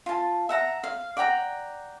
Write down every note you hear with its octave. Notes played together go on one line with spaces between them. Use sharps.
F4 A5
E5 F#5 A#5
F5
D5 F#5 G5 A#5